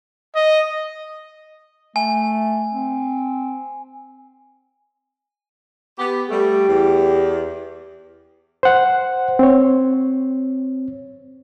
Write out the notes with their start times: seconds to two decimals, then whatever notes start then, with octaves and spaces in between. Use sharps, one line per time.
0.36 D#5
1.96 A3 G#5
2.73 C4
5.98 B3 G4
6.30 G3 A3 G4
6.67 E2
8.63 C5 F#5
9.39 C4 C#5